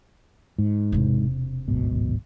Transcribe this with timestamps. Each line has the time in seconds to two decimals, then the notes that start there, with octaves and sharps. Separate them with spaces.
0.58 G#2
0.92 E1 C3
1.68 D1 G#1 B2